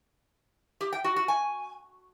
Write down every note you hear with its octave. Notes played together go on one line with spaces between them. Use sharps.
G4
G5
F#4
F#4
G#5